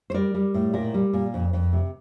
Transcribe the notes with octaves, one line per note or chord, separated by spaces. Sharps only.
C5
G3 A#4 D5
G3
A2
A#2 A#4 D5
G3
A#2
F2
F2
C3